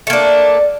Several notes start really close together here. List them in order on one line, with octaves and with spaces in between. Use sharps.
A3 A#3 D4